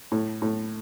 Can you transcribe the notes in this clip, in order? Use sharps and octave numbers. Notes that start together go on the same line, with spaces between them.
A2
A2